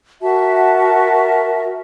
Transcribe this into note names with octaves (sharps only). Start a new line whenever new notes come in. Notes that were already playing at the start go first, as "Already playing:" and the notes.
F#4 A#4 E5 A5